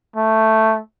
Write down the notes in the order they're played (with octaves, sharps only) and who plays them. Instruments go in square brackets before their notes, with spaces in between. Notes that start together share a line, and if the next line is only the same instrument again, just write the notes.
[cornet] A3